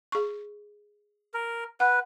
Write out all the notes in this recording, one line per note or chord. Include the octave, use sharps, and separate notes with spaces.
G#4 C#6
A#4
B4 F#5